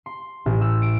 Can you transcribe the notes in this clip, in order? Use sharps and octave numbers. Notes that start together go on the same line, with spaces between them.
C6
A1
E6
D7